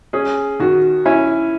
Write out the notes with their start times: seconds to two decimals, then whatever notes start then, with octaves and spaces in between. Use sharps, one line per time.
0.13 C#4 G#4
0.60 D#3 F#4
1.05 C#4 E4